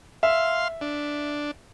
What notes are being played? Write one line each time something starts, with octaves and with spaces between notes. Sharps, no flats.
E5 F5 C6
D4